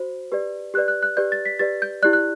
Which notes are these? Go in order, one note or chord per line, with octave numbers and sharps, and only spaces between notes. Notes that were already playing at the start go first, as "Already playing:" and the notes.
Already playing: F#4 C5
G4 B4 D5
G4 B4 D5 F#6
F#6
F#6
G4 B4 D5 G6
A6
B6
G4 B4 D5 A6
G6
E4 G4 D5 F#6
F#6